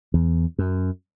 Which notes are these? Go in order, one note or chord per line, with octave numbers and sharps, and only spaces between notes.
E2
F#2